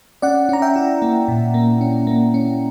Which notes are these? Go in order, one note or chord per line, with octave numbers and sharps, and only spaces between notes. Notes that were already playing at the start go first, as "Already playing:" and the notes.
C#4 D5 F#5
C#4 A#5
E5 G5
E4
A#3
A#2
A#3
C#4
A#3
C#4